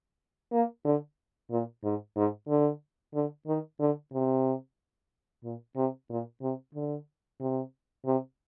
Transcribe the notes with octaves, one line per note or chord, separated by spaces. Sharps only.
A#3
D3
A#2
G#2
G#2
D3
D3
D#3
D3
C3
A#2
C3
A#2
C3
D3
C3
C3